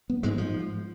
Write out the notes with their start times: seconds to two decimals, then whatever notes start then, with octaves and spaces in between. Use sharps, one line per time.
0.10 B3
0.23 G#2 G#3
0.38 F3